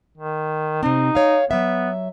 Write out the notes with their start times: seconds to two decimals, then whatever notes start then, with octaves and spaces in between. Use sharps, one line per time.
0.17 D#3
0.83 C3 C4 D#4
1.15 C#5 F5
1.51 F#3 B3 E5